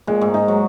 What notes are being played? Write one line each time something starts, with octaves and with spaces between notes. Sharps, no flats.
A#2 G#3
G#2
G#2 D#4
F#3